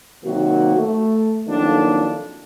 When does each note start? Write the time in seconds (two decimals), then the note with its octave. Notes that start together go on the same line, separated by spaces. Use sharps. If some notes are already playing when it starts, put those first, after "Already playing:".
0.24 C3 D#3 F#3 A#3 F#4
0.76 A3
1.47 F2 D#3 F#3 A#3 D4 E4